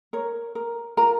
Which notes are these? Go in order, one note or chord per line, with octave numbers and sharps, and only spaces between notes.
A#4 C#5
A#4
F4 A#4 A#5